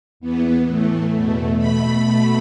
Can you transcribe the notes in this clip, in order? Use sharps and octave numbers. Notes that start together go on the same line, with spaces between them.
E2 E3 B3
A2 E3 A3
E2 B2 A3
B2 A3 B5
B2 A3